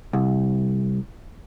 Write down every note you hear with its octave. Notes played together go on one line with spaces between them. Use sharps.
C2